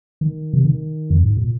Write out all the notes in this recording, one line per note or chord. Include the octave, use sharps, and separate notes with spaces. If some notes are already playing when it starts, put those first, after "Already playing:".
D#3
C3
D#3
F2
G#2
A#2